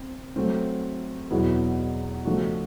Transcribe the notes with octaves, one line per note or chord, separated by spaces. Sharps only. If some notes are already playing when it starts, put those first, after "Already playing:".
Already playing: C4
F#3 A3 C4
E2 B2 F#3 B3 E4
C#3 F3 A3 D4 F#4